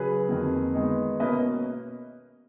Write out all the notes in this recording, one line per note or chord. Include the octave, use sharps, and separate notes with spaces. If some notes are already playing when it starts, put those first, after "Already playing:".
Already playing: C#3 F#3 G#4 B4
F2 D#3 A#3
D#3 G#3 B3 D#4
B2 A#3 C#4 B4 D#5